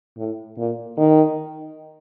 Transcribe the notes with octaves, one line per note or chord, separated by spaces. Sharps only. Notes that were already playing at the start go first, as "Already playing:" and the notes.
A2
A#2
D#3